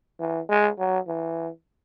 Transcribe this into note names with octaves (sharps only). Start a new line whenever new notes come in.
E3
G#3
F#3
E3